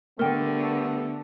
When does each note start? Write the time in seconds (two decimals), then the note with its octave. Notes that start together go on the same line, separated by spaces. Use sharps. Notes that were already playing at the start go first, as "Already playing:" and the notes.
0.19 D3 G3 A3 B3 A#4 G5